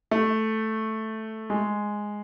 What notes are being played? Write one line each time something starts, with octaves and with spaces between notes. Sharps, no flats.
A3
G#3